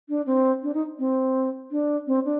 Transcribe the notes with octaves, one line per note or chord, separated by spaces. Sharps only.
D4
C4
D4
D#4
C4
D4
C4
D4